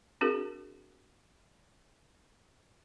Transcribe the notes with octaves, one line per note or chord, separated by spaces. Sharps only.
C4 D4 F#4 G#4 A#4